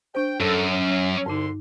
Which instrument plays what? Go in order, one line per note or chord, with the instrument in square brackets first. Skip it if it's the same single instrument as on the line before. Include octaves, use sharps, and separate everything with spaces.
[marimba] D4 C5 [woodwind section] G5
[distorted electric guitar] F#2 [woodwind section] A4
[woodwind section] C#4
[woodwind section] C2 D3 C6 [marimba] G2 D#4